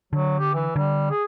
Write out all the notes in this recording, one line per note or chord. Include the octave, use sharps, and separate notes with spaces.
D3 F#3
G4
E3
D3 G3
G#4